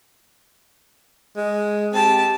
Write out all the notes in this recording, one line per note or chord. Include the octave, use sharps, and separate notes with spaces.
G#3
C4 G4 A5